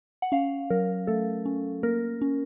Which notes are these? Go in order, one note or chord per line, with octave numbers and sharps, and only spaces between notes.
F#5
C#4 F5
F#3 A#4
A3 A4
C#4
A#3 A#4
C#4